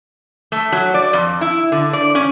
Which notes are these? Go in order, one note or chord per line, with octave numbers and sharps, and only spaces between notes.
A3
F#3
D5
F2
E4
D3
D5
C#4